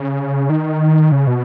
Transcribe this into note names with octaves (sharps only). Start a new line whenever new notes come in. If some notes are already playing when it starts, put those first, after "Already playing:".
Already playing: C#3
D#3
C#3
B2